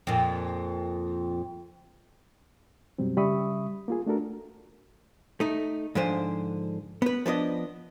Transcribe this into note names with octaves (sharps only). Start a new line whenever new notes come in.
F2 A#2
F#2 B2 F#3 G3 C4
C#3 G3 E5 B5 C#6 D#6
A#3 F4 G#4
A3 D4 F#4 A4 A#4
A3 D#4
G#2 D3 F3 C5 G#5
B3 B4
F3 B3 D4 D#5